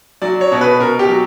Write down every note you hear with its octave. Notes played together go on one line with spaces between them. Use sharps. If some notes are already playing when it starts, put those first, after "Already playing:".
F#3 D5
C#5
B2
B4
B2 A#4
G4
F#3